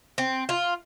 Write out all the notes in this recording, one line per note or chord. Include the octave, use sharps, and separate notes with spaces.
C4
F4